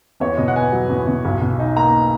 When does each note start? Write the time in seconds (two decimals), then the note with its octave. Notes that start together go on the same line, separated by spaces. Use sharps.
0.20 E2 C#5
0.38 B2 D#5
0.48 F#5
0.56 B3 G#5
0.72 F#3
0.89 E2
1.07 B2
1.25 B1
1.41 B2
1.59 D#4
1.77 A#3 A#5